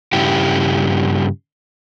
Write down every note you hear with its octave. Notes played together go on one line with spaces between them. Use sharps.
G2 C#3 E4 G4